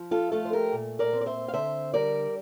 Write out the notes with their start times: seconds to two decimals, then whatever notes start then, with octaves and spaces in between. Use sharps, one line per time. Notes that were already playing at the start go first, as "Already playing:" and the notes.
Already playing: F3
0.11 F4 A4
0.32 A3 F4 A4
0.45 C5
0.53 G4 A#4
0.73 A#2
0.99 A#4 D5
1.13 C4
1.21 D5
1.26 C5 E5
1.48 F5
1.54 D3 C5 E5
1.94 G3 A#4 D5